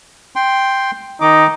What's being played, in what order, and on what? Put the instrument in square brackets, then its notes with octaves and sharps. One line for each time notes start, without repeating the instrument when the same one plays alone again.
[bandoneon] G5 C6
[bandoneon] D#3 D6 [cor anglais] D#4